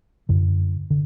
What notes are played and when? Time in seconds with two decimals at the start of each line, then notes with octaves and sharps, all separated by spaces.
0.29 F#2 D3
0.90 D3